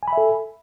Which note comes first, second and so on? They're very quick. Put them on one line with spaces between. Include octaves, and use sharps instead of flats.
G#5 B5 E5 A4